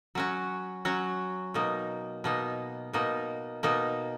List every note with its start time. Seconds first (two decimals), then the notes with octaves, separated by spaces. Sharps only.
0.15 F#3 C#4 F#4
0.85 F#3 C#4 F#4
1.54 B2 A#3 D#4
2.24 B2 A#3 D#4
2.93 B2 A#3 D#4
3.63 B2 A#3 D#4